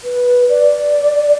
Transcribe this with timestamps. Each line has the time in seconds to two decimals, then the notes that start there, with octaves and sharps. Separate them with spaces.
0.04 B4
0.49 D5